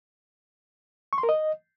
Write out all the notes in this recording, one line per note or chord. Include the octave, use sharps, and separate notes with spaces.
C#6
C6
A#4
D#5